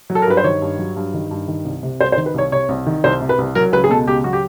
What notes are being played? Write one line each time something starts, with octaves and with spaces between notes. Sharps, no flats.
F#3
A4
A#4
G2 B4
C5
D#3 C#5
G2
F#3
G2
D#3
G2
D#3
C2
C3
C2 C5
C5
D#3
B4
C2 C#5
C3 C#5
C2
D#3
C2 C5
C3
B4
C2
F#3 A#4
C#2 B4
G#4
B2 A4
C#2 G4
F#3 F#4
G4